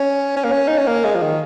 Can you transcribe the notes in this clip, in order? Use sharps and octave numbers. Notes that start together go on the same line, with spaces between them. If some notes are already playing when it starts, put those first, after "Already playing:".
Already playing: C#4
C#4
A#3
C#4
D#4
C#4
A#3
G#3
F3
D#3